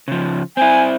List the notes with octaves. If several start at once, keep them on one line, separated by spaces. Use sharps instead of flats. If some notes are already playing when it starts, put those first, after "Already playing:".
C#3 F3
C4 E4 G#5